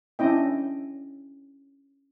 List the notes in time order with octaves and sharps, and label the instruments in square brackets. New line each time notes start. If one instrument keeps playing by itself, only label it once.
[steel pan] C#4 D4 E4 D#5 G5